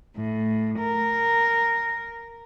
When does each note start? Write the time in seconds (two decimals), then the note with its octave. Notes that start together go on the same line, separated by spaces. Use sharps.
0.15 A2
0.78 A#4